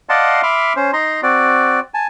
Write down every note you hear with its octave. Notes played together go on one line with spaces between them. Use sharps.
D5 D#5 F5 F#5 A5 C6
E5 B5 C6 D6 F6
C#4 C5
D#4 A#5 C6
C4 F#4 D5
G#5 A5